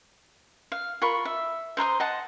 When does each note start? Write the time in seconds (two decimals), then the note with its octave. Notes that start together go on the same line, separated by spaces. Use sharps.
0.72 F5
1.02 F4 A#4 B5 C#6
1.25 E5
1.77 C5 A#5 C6 D#6
2.00 D#5 F#5 A5